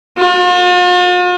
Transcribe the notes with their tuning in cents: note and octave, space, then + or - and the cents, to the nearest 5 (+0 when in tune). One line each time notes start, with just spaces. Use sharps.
F4 +45